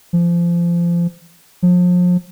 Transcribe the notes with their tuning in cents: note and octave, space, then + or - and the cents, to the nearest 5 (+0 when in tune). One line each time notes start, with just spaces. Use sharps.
F3 -25
F3 +35